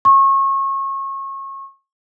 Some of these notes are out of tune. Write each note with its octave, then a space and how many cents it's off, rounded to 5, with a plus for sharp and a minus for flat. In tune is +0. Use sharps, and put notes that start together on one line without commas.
C#6 -30